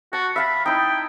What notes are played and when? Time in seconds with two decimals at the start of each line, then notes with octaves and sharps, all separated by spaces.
0.13 F#4 A5
0.36 E5 F5 A5 B5
0.66 D#4 E4 G5